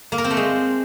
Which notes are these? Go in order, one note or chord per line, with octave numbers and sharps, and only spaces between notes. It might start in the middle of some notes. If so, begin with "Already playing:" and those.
A#3
A#4
C4
A3
G#3